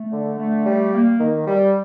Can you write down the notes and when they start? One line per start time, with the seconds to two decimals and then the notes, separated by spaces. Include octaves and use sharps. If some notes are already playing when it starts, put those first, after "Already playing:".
Already playing: A3
0.12 D3
0.39 A3
0.65 G3
0.93 A#3
1.19 D#3
1.46 G3